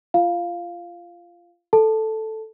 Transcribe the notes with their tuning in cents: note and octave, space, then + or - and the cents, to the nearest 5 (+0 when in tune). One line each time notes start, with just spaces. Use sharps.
F4 -20 F5 +0
A4 +0 A5 +0